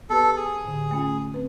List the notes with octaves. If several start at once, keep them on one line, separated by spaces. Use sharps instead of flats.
B3 G4 A4 B4
G#4
A2 D3
A3 C#4 F4
C4 B4